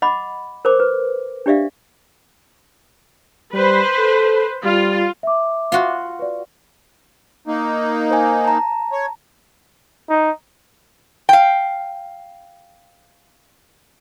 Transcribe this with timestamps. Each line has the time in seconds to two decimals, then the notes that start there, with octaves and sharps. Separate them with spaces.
0.02 D#5 F#5 B5 D6
0.65 A#4 C5 D6
0.80 B4
1.46 D4 G4 D5 E5 F5
3.53 G3 B4 C5
3.98 A4
4.64 G3 F4
5.23 E5 D6
5.72 F4 F#4
6.19 B4 D5
7.46 A#3 D#4
8.11 C5 G#5
8.44 A5 A#5
8.92 C#5
10.09 D#4
11.29 F5 G5